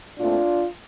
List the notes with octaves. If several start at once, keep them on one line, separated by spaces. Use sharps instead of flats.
A#2 A3 C4 D4 F4